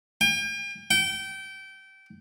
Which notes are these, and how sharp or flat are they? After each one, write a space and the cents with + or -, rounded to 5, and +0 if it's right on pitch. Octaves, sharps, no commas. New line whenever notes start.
G5 +40
G5 -25